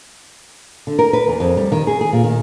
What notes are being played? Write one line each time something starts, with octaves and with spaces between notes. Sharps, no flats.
D3
A#4
B4
E2
F2
G3
D#3
G#4
G#4
A#2
D#3